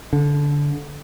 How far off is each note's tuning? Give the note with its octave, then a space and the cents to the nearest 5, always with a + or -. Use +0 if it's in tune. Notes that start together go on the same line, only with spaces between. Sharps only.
D3 -20